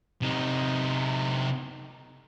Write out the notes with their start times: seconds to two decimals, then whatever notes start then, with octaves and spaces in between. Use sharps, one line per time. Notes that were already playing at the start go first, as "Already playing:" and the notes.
0.22 C3 D#4